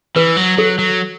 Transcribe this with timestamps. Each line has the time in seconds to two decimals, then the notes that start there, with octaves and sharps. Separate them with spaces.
0.16 E3 B4
0.37 F#3
0.58 F#3 A4
0.79 F#3